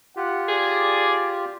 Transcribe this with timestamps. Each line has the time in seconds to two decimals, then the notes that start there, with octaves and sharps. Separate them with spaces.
0.17 F4 G4 F#5
0.48 G#4 D5